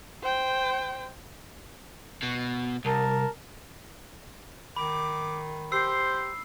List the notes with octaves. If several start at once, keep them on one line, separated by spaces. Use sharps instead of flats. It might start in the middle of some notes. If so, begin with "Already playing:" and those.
C5 G5
B2
C2 A#4 A5
D#3 B5 D6
G4 C5 E6 C7